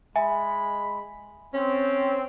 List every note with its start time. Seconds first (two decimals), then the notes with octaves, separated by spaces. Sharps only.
0.16 G#3 E5 G#5 B5
1.54 C4 C#4